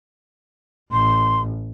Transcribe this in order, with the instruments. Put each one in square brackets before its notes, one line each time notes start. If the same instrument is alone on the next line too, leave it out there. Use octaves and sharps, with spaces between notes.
[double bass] A1 [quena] C6